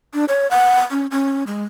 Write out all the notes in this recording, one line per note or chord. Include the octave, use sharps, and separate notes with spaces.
D4
C#5
F#5
C#4
C#4
G#3